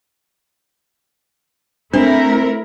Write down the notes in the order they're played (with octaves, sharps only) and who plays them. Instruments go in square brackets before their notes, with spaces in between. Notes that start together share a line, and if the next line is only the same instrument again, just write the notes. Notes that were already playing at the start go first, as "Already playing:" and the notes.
[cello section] A3 E4 A#4 [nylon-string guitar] C4 [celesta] D4